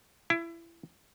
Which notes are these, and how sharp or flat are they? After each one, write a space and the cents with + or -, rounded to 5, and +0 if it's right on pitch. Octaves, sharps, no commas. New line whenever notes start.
E4 +25